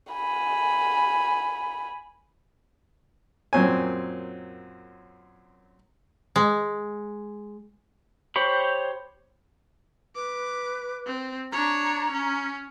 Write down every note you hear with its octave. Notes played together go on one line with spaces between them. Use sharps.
G#5 B5
F#2 A#2 C4 C#4 G#5
G#3
G4 C5 C#5 B5
B4 D6
C4
D4 C#5 A#5
C#4